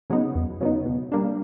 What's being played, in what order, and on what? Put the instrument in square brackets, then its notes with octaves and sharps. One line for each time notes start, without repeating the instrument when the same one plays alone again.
[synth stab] C#3 F#3 B3 D#4
E2
C#3 F#3 B3 D#4
B2
G3 A#3 D4